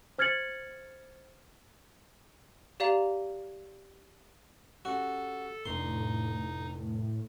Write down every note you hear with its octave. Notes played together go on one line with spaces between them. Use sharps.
C5 F6 G#6 A6 C#7 F#7
G4 D5 F5 A#5 F7
C#4 F#4 G4 A4
F1 A2 D4 D#4 C6